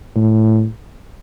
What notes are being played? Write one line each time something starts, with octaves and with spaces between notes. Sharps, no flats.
A2